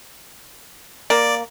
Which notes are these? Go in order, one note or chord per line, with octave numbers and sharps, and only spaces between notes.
A#3 D5